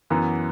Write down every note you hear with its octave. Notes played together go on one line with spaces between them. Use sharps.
F#2 E3 B3